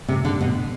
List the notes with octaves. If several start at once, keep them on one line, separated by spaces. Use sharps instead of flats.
C3
D3
B2